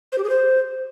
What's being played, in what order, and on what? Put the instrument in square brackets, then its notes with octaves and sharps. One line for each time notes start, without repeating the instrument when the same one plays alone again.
[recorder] C5
G4
G#4
C5